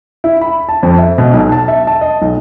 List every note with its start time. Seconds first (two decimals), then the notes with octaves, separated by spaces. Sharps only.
0.24 E4
0.41 B5
0.69 A5
0.83 F2
0.98 E5
1.18 B2
1.34 B1
1.52 A5
1.68 E5
1.87 A5
2.01 D#5
2.22 B1